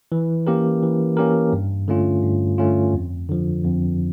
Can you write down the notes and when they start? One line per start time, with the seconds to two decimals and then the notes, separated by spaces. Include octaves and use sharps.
0.12 E3
0.47 A#3 C#4 G4 A#4
0.83 E3
1.17 A#3 C#4 G4 A#4
1.53 G2
1.88 D3 A3 C#4 F4
2.23 G2
2.58 D3 A3 C#4 F4
2.93 F2
3.29 D3 F3
3.64 F2